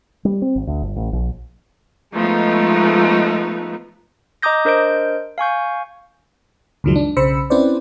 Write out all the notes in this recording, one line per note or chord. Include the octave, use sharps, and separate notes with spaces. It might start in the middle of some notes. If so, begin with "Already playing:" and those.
G3
C4
G#1
D2
G1
A1
A#1
F3 G#3 A3 B3 D#4
D#5 A#5 D6 D#6 G6 A#6
D4 A#4 C5 D#5 G6 D7
F5 G#5 C#6 G6
C#2 F#2 D#3 F3 F#3 G#3
D4
B1 C#3 C5 B5 E6 C#7
C4 C#4 E4 B4 C5 D5